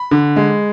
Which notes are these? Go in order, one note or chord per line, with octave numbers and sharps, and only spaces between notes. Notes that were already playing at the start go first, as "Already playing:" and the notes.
Already playing: B5
D3
G#3